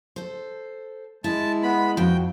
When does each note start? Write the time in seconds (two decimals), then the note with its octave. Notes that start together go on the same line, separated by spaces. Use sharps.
0.16 A4 C5
1.24 G#3 E4 A5
1.63 B3 B5
1.97 F2 F#4 G5